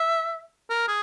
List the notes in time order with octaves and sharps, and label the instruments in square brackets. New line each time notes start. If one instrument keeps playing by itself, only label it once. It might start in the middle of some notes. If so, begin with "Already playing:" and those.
Already playing: [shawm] E5
A#4
G#4